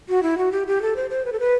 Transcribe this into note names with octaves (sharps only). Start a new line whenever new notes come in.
F#4
E4
F#4
G4
G4
A4
C5
C5
B4
A4
B4